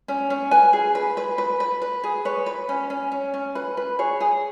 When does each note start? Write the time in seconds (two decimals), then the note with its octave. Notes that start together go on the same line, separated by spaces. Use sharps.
0.08 C#4
0.30 C#4
0.51 B4 G#5
0.73 G#4
0.95 B4
1.17 B4
1.38 B4
1.60 B4
1.82 B4
2.04 G#4
2.25 B4 C#5
2.46 B4
2.69 C#4
2.90 C#4
3.12 C#4
3.34 C#4
3.55 B4
3.77 B4
3.99 G#4 C#5
4.20 G#4